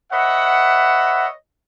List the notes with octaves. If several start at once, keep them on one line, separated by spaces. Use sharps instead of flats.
B4 C#5 D#5 E5 F#5